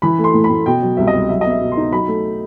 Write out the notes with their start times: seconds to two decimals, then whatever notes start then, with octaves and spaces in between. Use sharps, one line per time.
0.02 E3 B5
0.18 A3
0.24 C6
0.34 A2
0.44 B5
0.50 A2
0.66 B2 G5
0.82 F#3
0.97 C2 E5
1.07 D#5
1.13 C2
1.29 F#3 E5
1.41 B3 D#5
1.50 E5
1.61 B2
1.72 C6
1.77 D#4
1.92 F#3 B5
2.08 A3